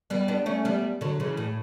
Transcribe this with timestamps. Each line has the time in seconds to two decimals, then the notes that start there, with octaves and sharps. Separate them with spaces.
0.10 G3 B3
0.28 B3 D4
0.46 A3 C#4
0.65 G3 B3
1.01 D3 F#3
1.20 C#3 E3
1.37 A2